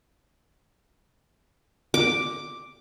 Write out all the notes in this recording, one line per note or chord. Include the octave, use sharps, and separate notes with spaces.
D6